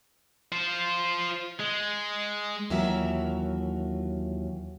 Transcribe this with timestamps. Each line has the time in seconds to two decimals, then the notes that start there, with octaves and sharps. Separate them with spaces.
0.52 F4 C5
1.59 G#3
2.70 D#2 E3 F#3 F4 A#4 E5